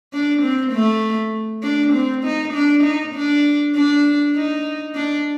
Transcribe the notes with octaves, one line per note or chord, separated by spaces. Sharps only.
D4
C4
A3
D4
C4
D#4
D4
D#4
D4
D4
D#4
D4